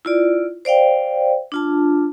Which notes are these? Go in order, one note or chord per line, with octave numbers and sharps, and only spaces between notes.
E4 F4 D5
C5 D5 F5 G5
D4 F4 A5